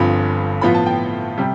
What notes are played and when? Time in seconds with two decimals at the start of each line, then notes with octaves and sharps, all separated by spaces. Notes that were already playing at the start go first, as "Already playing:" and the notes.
Already playing: G1 G2 F3 C4 F4 B5
0.61 A2 F3 B3 F4 B5
0.74 A5
0.86 G5
1.37 C3 G3